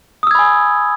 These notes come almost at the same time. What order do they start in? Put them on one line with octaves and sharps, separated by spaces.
D#6 E6 G#6 B5 G#5